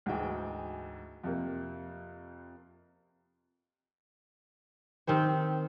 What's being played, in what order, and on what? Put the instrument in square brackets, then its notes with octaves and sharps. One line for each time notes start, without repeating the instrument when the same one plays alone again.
[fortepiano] D2 G#2 E3 F#4 G#4 G5
F2 C3 A#3
[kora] D#3 C4 G4 C5